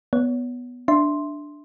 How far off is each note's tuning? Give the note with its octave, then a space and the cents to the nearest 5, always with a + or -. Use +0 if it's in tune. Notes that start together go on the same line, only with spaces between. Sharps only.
B3 +0 C#5 +25
D4 +0 E5 +0 C6 +0